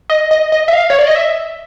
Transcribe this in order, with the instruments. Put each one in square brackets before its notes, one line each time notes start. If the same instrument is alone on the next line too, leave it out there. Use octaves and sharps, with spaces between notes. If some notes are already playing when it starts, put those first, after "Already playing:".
[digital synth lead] D#5
D#5
D#5
E5
F5
C#5
D5
D#5
E5